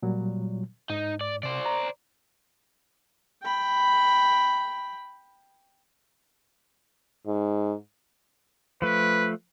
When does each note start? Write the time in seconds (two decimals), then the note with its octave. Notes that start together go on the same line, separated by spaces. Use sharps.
0.03 A#2 F#3 G3
0.90 G#2 D#4
1.21 D5
1.43 C3 C5 D5
1.66 A#5
3.43 G5 B5
7.27 G#2
8.82 F3 A3 B4